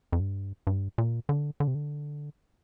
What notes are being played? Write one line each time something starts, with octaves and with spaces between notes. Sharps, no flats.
F2
G2
G2
A#2
D3
D3
C3
D3